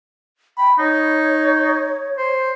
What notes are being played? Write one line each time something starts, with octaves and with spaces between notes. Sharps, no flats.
G5 B5
D#4 C#5
C5